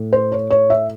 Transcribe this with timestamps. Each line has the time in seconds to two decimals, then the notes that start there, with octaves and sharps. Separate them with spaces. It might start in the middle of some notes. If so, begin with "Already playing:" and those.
Already playing: A2 A3
0.13 C5
0.32 C#5
0.50 C#5
0.70 E5